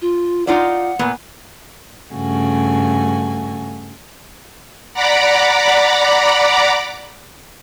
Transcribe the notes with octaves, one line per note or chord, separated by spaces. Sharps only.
F4
D#4 F4 D5 F#5
A#2 B3
G2 C#3 A3 F#4 G#5
D5 F#5 A#5 B5 D6